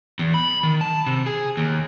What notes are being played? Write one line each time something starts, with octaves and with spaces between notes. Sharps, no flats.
E2
B5
D#3
A5
C3
G#4
D#2